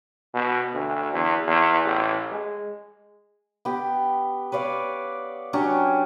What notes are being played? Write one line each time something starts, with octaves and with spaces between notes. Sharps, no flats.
B2
D2
E2
E2
A1
G#3
B3 G4
B4 C#5 D5 F5
F#3 C#4 D4 G4